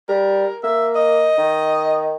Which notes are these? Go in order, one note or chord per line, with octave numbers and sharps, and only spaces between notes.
G3 A#4
A#3 E5
D#5
D#3